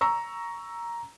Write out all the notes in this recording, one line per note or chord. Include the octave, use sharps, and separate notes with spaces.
A#5 C#6 E6